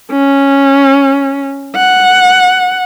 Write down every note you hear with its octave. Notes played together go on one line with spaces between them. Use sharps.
C#4
F#5